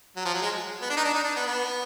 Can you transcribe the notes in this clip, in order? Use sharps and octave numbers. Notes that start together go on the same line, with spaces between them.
F#3
F3
F#3
G#3
B3
D4
D#4
D4
D#4
D4
B3
B3